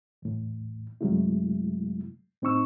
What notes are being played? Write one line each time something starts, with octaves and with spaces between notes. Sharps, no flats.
E2 A2
F#2 C3 F#3 G#3 A3 E4
A2 C4 D#4 C#6 E6